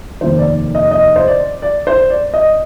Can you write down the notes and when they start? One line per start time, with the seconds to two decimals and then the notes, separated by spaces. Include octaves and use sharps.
0.21 F1 D#2 D#3 C5
0.39 D5
0.75 D#5
0.91 D#5
1.16 C5
1.28 D5
1.62 D5
1.87 C5
2.10 D5
2.34 D#5